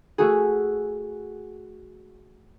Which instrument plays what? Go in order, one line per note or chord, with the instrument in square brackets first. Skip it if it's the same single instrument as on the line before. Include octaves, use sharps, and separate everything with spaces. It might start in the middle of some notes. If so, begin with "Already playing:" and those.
[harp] A3 F#4 G#4